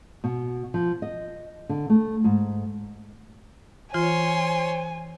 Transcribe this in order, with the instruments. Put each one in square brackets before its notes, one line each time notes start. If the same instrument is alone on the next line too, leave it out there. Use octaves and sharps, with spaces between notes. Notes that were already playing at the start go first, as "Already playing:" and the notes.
[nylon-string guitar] B2
F3
D#5
D3
A3
G#2
[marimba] E3 F4 [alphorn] C5 [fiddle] C#5 C6 [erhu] G#5